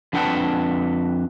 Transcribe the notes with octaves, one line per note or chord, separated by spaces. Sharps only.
F2 D4 B4 F#5 G5 A5